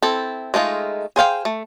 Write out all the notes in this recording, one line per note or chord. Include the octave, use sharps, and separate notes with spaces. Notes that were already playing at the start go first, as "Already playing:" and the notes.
C4 E4 A4
G#3 A3 D#4 F4
G#4 C5 F5 G5
A3